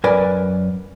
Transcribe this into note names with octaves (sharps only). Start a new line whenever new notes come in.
F#2 A#4 B4 D5 G#5 B5